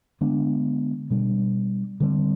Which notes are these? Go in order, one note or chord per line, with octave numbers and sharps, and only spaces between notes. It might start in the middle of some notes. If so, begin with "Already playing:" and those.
D3 G#3 B3 D4
B2 G3 D4
D3 G3 C4